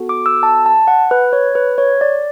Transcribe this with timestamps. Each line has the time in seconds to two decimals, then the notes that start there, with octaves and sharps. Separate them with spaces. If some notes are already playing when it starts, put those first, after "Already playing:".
Already playing: B3 F#4 A4
0.09 D6
0.26 E6
0.43 A5
0.66 A5
0.88 F#5
1.11 B4
1.33 C#5
1.55 B4
1.78 C#5
2.01 D5